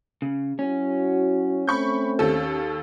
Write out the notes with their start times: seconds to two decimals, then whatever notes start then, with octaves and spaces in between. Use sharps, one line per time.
0.22 C#3
0.59 F#3 C#4 E4 F#4
1.67 A3 C4 B5 C#6 G6
2.19 D#2 A4